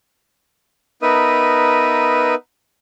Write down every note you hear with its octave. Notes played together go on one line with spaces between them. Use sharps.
B3 D#4 A#4 B4 E5 D#6